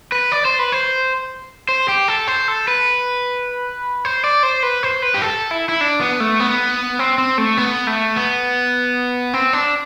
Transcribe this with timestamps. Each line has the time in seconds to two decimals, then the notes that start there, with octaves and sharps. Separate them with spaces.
0.12 B4
0.32 D5
0.45 C5
0.59 B4
0.72 C5
1.69 C5
1.88 G4
2.08 A4
2.28 C5
2.48 A4
2.68 B4
4.05 C5
4.24 D5
4.43 C5
4.63 B4
4.83 C5
5.02 B4
5.14 G4
5.22 A4
5.51 E4
5.69 E4
5.81 D4
6.01 B3
6.20 A3
6.40 B3
6.99 C4
7.18 C4
7.38 A3
7.57 B3
7.87 A3
8.16 B3
9.33 C4
9.53 D4